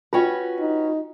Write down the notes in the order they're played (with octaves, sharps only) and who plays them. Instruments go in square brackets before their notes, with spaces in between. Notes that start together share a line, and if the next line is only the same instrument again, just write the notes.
[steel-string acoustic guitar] C#4 F#4 B4 [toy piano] F4 G5
[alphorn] D#4